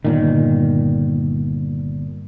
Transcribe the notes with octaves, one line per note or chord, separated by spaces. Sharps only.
G1 A#2 D#3